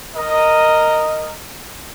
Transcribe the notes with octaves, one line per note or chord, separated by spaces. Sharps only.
A#4 D#5